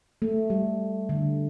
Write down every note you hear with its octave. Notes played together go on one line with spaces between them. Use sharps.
A3
G3
D3